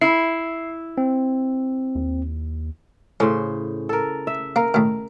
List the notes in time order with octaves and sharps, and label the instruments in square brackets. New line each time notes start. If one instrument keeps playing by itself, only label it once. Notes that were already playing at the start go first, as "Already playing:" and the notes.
[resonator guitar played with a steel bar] E4 [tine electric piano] C7
[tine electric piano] C4
[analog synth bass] D#2
[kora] A2 C#3 C5 [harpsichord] C#4
[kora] A4 A#4
E5
[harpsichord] A#3 [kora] A#4
[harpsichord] A2 D#3